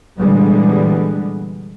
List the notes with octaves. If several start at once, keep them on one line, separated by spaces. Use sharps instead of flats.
A#2 D3 E3 G3 G#3 B3